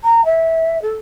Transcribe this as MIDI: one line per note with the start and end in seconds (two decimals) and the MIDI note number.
0.04 0.24 82
0.25 0.80 76
0.82 0.94 69